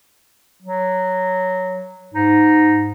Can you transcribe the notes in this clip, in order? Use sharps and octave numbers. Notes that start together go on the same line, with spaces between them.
F#3
G#2 D#4